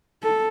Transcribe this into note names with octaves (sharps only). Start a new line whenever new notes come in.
A4